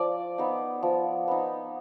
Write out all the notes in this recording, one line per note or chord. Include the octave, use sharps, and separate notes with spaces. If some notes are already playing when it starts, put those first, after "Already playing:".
Already playing: F3 D5
B3 D#4
F3
B3 D#4